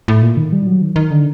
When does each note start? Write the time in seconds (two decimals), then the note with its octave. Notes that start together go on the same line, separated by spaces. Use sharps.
0.08 A2
0.22 A#2
0.37 D#3
0.52 G3
0.67 F#3
0.82 D#3
0.96 D#3
1.11 D3